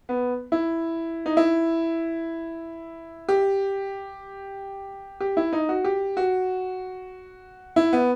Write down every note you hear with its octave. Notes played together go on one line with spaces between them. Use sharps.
B3
E4
D#4
E4
G4
G4
E4
D#4
F#4
G4
F#4
E4
B3